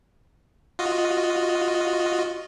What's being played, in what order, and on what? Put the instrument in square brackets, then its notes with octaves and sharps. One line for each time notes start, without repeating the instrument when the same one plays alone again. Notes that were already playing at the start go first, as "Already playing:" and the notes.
[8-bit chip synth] F4 F#4 D#5